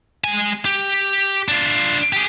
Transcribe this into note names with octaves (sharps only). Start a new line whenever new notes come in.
G#3 G#5
G4
D4 F4
G4 G#4